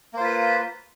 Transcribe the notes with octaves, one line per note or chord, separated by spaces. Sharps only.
A#3 F4 B4 C5